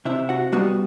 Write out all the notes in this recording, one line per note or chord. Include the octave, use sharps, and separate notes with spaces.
C3 E4 E5
F#4 F#5
G3 B3 F#4 F#5